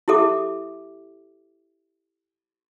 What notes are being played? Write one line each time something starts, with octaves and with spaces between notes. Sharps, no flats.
E4 G4 A4 E5 D6